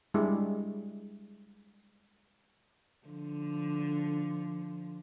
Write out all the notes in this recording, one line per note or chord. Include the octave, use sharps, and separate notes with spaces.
G3 G#3 D4 E4
D3 F3